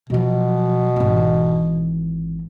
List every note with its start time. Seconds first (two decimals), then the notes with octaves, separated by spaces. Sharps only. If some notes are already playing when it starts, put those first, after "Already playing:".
0.10 B2 F3 F#3
0.96 G#1 E3